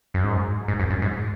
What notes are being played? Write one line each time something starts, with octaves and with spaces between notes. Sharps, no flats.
F#2
G#2
G#2
F#2
F#2
G#2